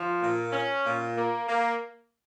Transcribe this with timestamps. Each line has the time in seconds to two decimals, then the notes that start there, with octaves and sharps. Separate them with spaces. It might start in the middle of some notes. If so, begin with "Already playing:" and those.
Already playing: F3
0.21 A#2
0.53 C#4
0.84 A#2
1.16 A#3
1.48 A#3